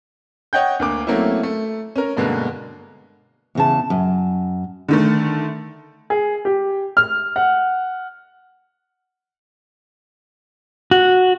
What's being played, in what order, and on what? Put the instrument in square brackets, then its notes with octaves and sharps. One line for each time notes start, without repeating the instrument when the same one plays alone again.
[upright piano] C#5 D#5 F#5 G5 G6
D2 A#3 D6
F#3 A3 A#3 C4 C#4 E4
A3
C#4 A#4
G2 B2 D3 G#3 A#3
[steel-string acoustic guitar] E2 C#3 A5
F#2
[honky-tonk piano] D3 D#3 A3
[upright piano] G#4
G4
F6
F#5
[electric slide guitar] F#4